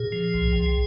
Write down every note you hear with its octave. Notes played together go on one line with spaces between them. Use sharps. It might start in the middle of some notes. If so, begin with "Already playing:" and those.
Already playing: A#2 G#4
F3
C2
C2